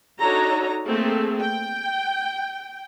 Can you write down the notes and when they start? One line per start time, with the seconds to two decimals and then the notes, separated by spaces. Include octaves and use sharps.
0.19 D4 D#4 F#4 A4 C#5 A#5
0.87 A3 A#3 C4 G#4 A4
1.40 G5